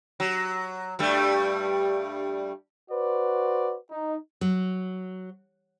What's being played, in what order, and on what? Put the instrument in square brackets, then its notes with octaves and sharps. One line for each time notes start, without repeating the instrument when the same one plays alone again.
[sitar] F#3
G2 G3 A3
[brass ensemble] F#4 B4 C5 D5
D#4
[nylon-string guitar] F#3